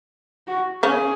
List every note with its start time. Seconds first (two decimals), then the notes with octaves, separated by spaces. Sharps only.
0.47 F#4
0.83 C#3 C#4 G#4